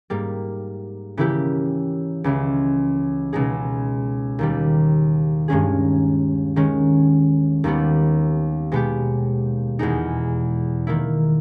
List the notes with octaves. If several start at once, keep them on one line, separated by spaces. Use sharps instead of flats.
G#2 G3 A#3
C#3 E3 A#3 E4 G4
C#2 C#3 E3
C#2 B2 G#3 D#4 G#4
D#2 D#3 G3
G2 D#3 G#3 C#4 G#4
D#3 G#3 C#4
D#2 D#3 G3 B3
B2 G#3 B3 G4
E2 B2 G#3 D#4
D#3 A#3 E4